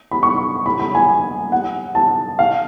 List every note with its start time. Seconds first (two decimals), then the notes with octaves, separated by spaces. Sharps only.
0.11 B5
0.23 C#6
0.66 B5
0.80 B5
0.95 G#5
1.52 F#5
1.95 A5
2.39 F5